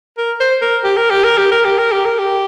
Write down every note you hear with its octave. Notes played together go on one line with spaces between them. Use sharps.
A#4
C5
A#4
G4
A#4
G4
A#4
G4
A#4
G4
A#4
G4
A#4
G4